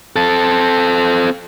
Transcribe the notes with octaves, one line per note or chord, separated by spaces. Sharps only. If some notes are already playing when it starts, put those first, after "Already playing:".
C4 A4